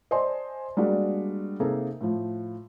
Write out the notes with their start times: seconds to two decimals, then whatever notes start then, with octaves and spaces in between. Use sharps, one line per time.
0.11 C5 D5 D#5 G#5 A5 C6
0.77 G3 G#3 A#3 D4 F#4
1.60 C3 A#3 D#4 G#4 A4
2.01 A2 F3